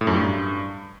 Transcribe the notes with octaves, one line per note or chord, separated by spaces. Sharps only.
A2
F#2
G2